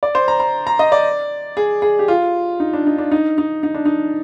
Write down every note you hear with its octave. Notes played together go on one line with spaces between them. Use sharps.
D5
C5
A#5
A#5
A#5
D#5
D5
G#4
G#4
G4
F4
D#4
D4
D#4
D4
D#4
D#4
D#4
D4
D#4